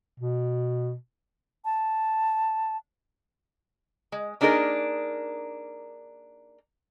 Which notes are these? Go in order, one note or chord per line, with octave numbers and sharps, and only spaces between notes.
B2
A5
G#3
A#3 D4 D#4 G#4 A#4